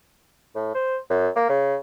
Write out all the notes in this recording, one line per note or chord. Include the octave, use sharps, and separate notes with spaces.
A2
C5
F#2
A#3
C#3